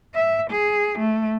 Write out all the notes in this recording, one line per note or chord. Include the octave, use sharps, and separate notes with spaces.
E5
G#4
A3